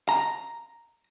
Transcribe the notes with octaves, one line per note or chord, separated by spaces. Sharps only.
A#5